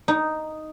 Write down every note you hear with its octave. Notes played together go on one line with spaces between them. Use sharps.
D#4